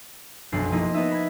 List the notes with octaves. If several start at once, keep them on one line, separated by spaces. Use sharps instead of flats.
F1 B1 F#2 D4 C7
F3 A#3 D#4 E4
B3 D#4 D#5 E5
B5 G#6